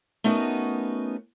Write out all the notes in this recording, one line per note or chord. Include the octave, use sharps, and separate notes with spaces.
A3 B3 C#4 D#4 F#4 A#4